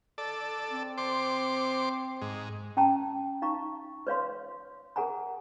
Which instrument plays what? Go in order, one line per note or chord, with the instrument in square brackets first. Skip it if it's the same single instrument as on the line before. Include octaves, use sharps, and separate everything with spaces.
[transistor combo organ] A4 D5
[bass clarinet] C4
[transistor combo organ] C5 D6
G#2
[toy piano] C#4 G5 A5 A#5
D#4 F5 A#5 C#6
B4 C#5 F5 C6
G#4 A#4 F#5 G#5 A#5